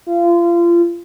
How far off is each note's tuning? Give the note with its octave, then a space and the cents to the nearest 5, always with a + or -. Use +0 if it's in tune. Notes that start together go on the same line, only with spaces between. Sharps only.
F4 -30